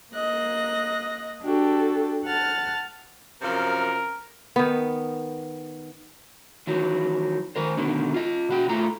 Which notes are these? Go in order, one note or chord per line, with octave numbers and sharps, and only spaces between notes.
A#3 D#5 F#6 A#6
D4 F#4 G4 A4
F#5 A5 F6 A6
F#2 C3 F3 A#4
D#3 B3
D#3 E3 F#3
D#3 A#4 C5
B2 D3 D#3
F4 D#5
B2 F#4 G5
A2 A3 F4 A#5